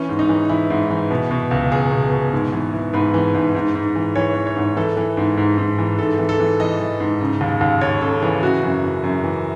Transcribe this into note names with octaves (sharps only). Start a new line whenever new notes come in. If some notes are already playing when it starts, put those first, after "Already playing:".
Already playing: E3 C#4
G#2
D#4
E3
E3 E4
G#2
E3
B2
B2
C#2
C#2 G#4
B2
B2
G#2
E3
E3
G#2 B4
E3
G#2
G#2
G#2
E3
E3 C#5
E3
C#5
G#2
E3 A4
E3
G#2
G#2
G#2
E3
G#2 A4
E3
A4
E3
E3 D#5
E3
G#2
C#3
D#2
D#2
D#2 C#5
C#3 A4
E3 G#4
C#3 F#4
F#2
E3
F#2
E3